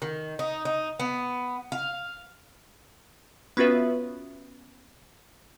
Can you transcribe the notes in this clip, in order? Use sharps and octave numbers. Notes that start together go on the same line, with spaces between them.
D#3
D#4
D#4
B3
F5
B3 C#4 F4 F#4 B4 E5